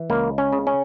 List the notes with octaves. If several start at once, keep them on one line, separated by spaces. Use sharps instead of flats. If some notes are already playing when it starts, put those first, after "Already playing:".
Already playing: E3
C#2 A#3
C#4
C#3
C#4